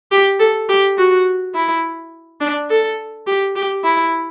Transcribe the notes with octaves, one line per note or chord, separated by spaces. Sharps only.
G4
A4
G4
F#4
E4
D4
A4
G4
G4
E4